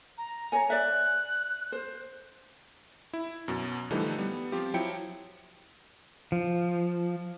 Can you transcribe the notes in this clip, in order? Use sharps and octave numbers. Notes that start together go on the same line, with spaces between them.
A#5
C#5 G#5
D5 E5 F#6
C5
E4
F#2 B2
D3 E3 F3 G3 A3 D#4
G3 B3
F3 C4 F4 G4
F3 F#3 E4 G5 C#7
F3